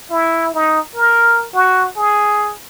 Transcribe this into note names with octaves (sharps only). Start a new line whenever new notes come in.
E4
D#4
A#4
F#4
G#4